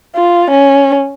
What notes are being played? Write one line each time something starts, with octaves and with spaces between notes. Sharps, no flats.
F4
C#4